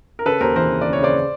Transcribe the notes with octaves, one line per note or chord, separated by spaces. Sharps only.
A#4
C#3 A4 B4
D#2 A#4 C5
E3 A#4 C5
C#3
C#3 D5
C#5
C#3 C5 D5